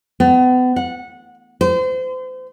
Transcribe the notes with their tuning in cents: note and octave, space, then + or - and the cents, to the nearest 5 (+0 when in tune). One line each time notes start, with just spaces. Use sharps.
B3 +35
F#5 -20
C5 -35